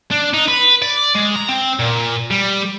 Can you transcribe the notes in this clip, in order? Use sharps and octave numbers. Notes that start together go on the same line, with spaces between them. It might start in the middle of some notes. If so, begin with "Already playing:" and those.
D4
D#4
B4
D5
G#3
A#5
C4
A#2
G3